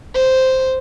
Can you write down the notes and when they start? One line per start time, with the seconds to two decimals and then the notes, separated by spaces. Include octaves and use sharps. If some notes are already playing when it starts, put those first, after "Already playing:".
0.15 C5